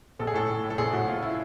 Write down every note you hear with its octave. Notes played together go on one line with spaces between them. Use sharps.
A#1 A4
G#4
A2 A4
A2
A2
A4
A#1 G#4
A2 F#4
A#1 F4
E4